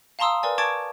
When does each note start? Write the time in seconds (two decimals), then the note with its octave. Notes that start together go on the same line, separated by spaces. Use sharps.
0.19 F5 A5 A#5 C6 D#6 E6
0.43 A#4 B4 D5 G#5
0.58 A5 C#6 D6 G#6 A6 D7